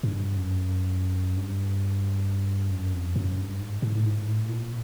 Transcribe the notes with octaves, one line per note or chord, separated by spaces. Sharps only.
G2
F#2
G2
F#2
F2
F#2
G2
G#2
G#2
A2
G#2
A2
A#2